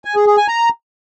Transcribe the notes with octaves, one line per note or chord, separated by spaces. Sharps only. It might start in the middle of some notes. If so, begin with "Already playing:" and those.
G#5
G#4
G#4
G#5
A#5